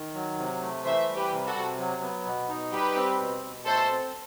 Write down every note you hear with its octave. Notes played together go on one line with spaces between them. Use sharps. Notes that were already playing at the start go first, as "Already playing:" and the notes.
Already playing: D#3
F#3
C3
A3
E3 C5 E5
G3
G4 B4
C3
F#4 A4
C3
F#3
B3
B2
D#4
G3 G4 B4
C4
B2
B2
A3 A4 C5
C4